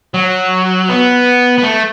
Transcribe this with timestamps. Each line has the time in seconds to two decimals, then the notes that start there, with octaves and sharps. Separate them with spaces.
0.14 F#3
0.89 B3
1.59 B3
1.64 A3